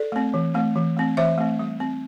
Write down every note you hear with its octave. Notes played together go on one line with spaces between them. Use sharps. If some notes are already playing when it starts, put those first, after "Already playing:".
Already playing: A4 D5
A3 C4
E3
A3 C4
E3
A3 C4
E3 C5 E5
A3 C4
G3
C4